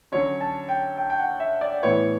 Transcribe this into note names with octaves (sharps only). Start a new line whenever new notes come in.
D3 F#3 C#4 C#5
A5
G5
G5
G5
F#5
E5
D5
A2 E3 B3 C#5